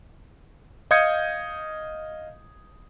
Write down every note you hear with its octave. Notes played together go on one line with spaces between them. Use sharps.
D#5 F5 D#6 G6 G#6 C#7